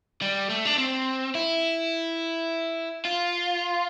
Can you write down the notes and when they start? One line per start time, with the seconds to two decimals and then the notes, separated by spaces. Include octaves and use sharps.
0.22 G3
0.50 A3
0.66 D4
0.78 C4
1.35 E4
3.05 F4